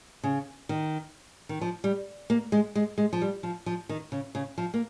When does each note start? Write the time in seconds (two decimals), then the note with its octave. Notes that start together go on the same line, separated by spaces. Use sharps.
0.24 C#3
0.69 D#3
1.49 D#3
1.61 F3
1.84 G3
2.30 A#3
2.52 G#3
2.75 G#3
2.98 G#3
3.13 F3
3.22 G3
3.43 F3
3.66 F3
3.89 D#3
4.12 C#3
4.35 C#3
4.58 F3
4.74 A#3